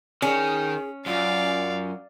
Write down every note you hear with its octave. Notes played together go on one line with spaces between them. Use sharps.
D#3 C#4 G#4
F#2 F4 D5 F5